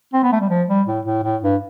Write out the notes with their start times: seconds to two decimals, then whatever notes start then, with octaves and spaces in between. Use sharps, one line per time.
0.13 C4
0.23 B3
0.32 A3
0.40 G3
0.49 F3
0.69 G3
0.87 A2
1.06 A2
1.23 A2
1.43 G2